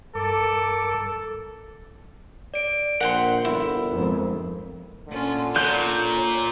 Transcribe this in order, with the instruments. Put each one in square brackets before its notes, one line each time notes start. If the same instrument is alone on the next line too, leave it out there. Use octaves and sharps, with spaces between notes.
[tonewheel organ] G2 A#4 D6 [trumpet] A4
[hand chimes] D5 D7
[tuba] A#1 [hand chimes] A#4 [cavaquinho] F#5 G5 C6
[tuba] G1 [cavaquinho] E4
[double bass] F2 G#2
[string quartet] A#2 C#4 F4 [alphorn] D3
[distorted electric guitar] A#2 [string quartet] C#5 [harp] G6